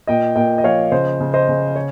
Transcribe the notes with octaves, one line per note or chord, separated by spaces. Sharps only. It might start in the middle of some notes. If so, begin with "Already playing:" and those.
A#2 D#5 G5
A#2 D#5 G5
D#5
F3 C#5 F5
C#3 C5 D#5
C#3
C5 D#5
C#3
C#5